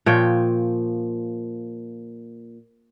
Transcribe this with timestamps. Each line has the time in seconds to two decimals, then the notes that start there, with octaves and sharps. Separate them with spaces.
0.06 A#2 F3 C#5 G5